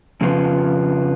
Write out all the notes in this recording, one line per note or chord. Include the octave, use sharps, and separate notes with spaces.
F2 C#3 F3 B3 F4